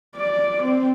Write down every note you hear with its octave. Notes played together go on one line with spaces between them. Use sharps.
D5
C4